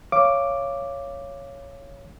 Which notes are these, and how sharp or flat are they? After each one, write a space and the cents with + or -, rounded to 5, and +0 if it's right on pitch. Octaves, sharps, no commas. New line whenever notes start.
C#5 +0 F5 -25 D6 +0